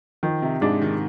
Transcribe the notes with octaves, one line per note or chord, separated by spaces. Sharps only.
D#3 F3
C3
G#2 G#3 D4
D#3